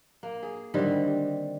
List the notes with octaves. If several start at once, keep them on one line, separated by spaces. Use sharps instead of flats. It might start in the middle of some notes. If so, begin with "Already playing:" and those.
A#3
G#4
D3 D#3 G3 C4